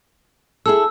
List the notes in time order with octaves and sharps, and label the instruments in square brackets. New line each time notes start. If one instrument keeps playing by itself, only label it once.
[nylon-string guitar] E4 G#4 A4 [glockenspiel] E6